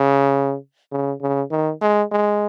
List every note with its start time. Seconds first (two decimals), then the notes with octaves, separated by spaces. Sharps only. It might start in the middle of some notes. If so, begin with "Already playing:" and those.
Already playing: C#3
0.92 C#3
1.21 C#3
1.51 D#3
1.82 G#3
2.12 G#3